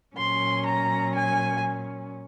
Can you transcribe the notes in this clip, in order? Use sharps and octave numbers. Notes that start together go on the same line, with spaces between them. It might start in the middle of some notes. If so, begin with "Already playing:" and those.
A#2 F#3 C#4 C6
A#5
G#5